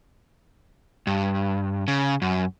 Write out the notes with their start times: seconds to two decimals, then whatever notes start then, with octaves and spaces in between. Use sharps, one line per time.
1.07 G2
1.88 C#3
2.22 F#2